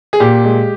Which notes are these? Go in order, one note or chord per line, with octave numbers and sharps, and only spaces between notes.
G#4
A#2 G4
G#3